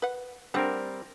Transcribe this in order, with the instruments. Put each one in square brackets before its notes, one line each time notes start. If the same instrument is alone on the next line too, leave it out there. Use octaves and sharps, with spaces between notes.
[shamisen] B4 F#5
[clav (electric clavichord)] G3 C4 A#4 [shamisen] A3 D4 F#5